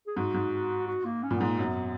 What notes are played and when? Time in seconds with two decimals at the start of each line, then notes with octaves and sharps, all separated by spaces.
0.07 G#4
0.17 G#2 F#4
0.34 G#2
0.88 F#4
1.05 A#3
1.23 C#4
1.31 A#2 B3
1.40 G#2
1.47 A#3
1.59 F#2 B3